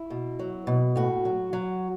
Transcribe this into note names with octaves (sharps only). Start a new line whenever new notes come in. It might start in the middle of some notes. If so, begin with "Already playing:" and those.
Already playing: E4
B2
F#3
B2
A2 F#4
F#3
F#3